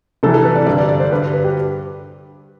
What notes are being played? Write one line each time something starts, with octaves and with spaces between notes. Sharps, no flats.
C2 C3 E3 A4
A4
B4
D5
G2 D3 D5
D5
D5
C5
G2 D3 B4
B4
G4